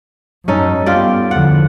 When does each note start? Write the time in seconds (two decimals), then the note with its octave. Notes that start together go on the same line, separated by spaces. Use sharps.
0.48 F#2 C#4 D#4 A4
0.86 G2 B3 F4 G4 D5
1.31 E2 D3 F3 F#5